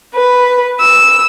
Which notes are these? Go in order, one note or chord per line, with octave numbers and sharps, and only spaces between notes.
B4
E6